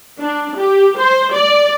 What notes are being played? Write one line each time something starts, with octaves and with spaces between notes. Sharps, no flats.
D4
G4
C5
D5